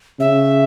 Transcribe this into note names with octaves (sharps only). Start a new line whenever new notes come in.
C#3 E5